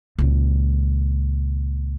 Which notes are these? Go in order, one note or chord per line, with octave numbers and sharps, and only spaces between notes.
C#2 A#2